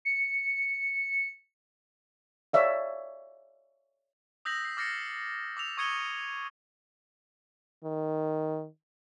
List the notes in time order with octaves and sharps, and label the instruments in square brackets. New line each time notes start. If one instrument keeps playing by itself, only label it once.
[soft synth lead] C#7
[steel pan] C#5 D5 E5 F5
[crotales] D#6 E6 G6 A#6 B6 F#7
C7
D6 F6 A6 A#6 C7 C#7
D6 E6 F7
C#6 D#6 G#6 C#7 D#7 G7
[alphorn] D#3